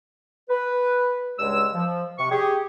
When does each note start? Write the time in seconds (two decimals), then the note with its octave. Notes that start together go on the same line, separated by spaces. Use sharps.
0.49 B4
1.39 C#2 G2 G#3 E6
1.74 F3
2.18 C3 C#6
2.30 G4 G#4